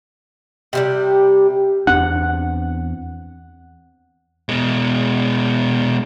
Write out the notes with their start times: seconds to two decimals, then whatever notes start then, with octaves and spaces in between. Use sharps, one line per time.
0.73 C3 D#3 G3
1.87 E2 C4 D4 F#5
4.49 B2 G#3